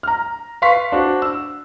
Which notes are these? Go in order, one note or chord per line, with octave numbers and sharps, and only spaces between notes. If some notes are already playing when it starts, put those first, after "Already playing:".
A#5 F6
B4 F5 C6 C#6 B6 C7
D4 F#4 C5
E6